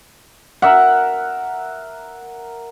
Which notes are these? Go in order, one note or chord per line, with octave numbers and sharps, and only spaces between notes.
A#4 E5 F#5